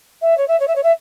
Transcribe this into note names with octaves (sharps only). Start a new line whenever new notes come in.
E5
C#5
E5
C#5
E5
C#5
E5